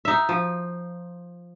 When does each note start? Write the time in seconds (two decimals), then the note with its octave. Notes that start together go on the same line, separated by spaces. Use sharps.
0.05 D#4 E5
0.29 F3